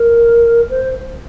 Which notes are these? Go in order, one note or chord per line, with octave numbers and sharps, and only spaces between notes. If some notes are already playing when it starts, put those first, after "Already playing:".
Already playing: A#4
C5